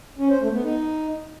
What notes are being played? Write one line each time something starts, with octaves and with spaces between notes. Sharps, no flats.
C#4
C5
A3
B3
D#4